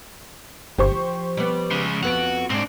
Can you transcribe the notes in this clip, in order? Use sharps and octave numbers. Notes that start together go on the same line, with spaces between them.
G1 G4 C5 C#6
F3
G3 B3
C#3 G#3
F2 B3 F#4 D7 F7
G#2 C4 D4